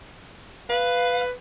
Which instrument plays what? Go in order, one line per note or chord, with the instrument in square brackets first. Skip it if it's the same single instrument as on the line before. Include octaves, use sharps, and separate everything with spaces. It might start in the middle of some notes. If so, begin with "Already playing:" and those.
[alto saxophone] B4 [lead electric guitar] F5